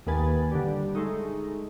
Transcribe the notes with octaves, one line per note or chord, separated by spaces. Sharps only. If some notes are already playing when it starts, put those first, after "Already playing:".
D#2 A#3 B4 G#5 A6
D3 G3
G#3 A3 D#4